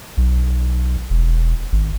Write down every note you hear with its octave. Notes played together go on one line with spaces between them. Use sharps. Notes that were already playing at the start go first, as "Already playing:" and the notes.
B1
E1
G#1